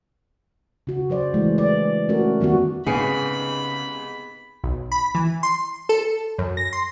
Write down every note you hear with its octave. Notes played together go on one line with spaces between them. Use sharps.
C#3 F#4
F#3 C5 D5
E3 G#3 A3
D5
A3 C#4 F#4 A#4
D#3 G3 B3 F#4
C2 G#2 C#3 B3 G#4 B5
B1
B5
E3
C6
A4
F#2
A#6
C6